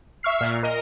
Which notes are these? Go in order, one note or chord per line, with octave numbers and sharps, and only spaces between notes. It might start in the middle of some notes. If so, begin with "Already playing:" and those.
E5 C#6 F6 C7
A#2
A#4 D#5 D#6